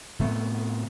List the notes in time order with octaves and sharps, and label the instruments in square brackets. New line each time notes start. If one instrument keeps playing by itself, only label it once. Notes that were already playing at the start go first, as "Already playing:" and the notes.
[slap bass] A2 C3 A3 B3